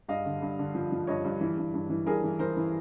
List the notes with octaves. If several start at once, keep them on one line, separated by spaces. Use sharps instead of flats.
G2 D#5 F5
D3
G2
D3
F3
F3
G2 C#5 D#5
G2
E3
G2
G2
E3
G2 G#4 A#4
E3
E3 A#4 C5
E3